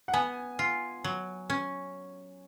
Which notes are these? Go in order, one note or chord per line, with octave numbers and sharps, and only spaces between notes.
F#5
B3 G#5
F4
F#3
C#4